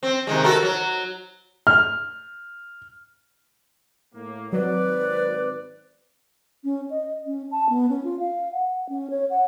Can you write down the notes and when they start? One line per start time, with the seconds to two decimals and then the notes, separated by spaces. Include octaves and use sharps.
0.03 C4
0.27 C3 D#3 G#3
0.44 F#4 A4 A#4
0.62 F#3
1.67 F6
4.14 A2 A#3
4.53 G#1 F#3 C4 B4 D5
6.64 C#4
6.90 D#5
7.26 C#4
7.51 A5
7.69 B3
7.89 C#4
8.04 F4
8.19 F5
8.53 F#5
8.89 C#4
9.10 C#5
9.30 F#5